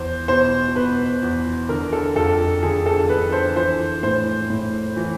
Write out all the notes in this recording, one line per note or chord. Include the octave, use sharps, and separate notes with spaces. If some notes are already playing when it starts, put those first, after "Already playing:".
Already playing: E2 C5
B2 C5
B2 B4
E2
D3 A#4
A4
F2 A4
D3 G#4
A4
D3 B4
C5
E3 C5
A2 C5
A2
E3